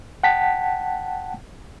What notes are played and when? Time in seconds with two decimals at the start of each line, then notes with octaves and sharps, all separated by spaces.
0.24 F#5 G5 A5 B6